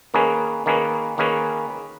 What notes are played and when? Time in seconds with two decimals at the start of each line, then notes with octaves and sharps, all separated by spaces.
0.14 D#3 A#3 C#4 G#4 B4
0.66 D#3 A#3 C#4 G#4 B4
1.18 D#3 A#3 C#4 G#4 B4